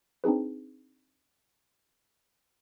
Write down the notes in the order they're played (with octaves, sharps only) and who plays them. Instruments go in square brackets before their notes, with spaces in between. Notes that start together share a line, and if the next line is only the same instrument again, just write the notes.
[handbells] C4 D4 D#4 G#4 B4